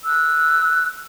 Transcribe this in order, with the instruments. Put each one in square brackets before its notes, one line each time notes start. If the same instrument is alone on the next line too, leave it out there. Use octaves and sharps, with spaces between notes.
[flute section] E6 F#6